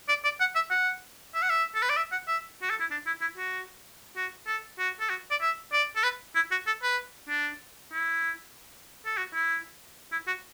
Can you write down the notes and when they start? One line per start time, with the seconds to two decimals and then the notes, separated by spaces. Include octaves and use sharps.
0.09 D5
0.24 D5
0.40 F#5
0.55 E5
0.71 F#5
1.34 E5
1.42 F#5
1.50 E5
1.75 A4
1.82 B4
1.89 D5
1.97 E5
2.12 F#5
2.28 E5
2.62 F#4
2.70 A4
2.80 E4
2.91 D4
3.07 E4
3.21 E4
3.38 F#4
4.16 F#4
4.47 A4
4.79 F#4
5.00 A4
5.10 F#4
5.31 D5
5.41 E5
5.73 D5
5.96 A4
6.04 B4
6.36 E4
6.51 F#4
6.67 A4
6.83 B4
7.29 D4
7.93 E4
9.06 A4
9.18 F#4
9.34 E4
10.12 E4
10.28 F#4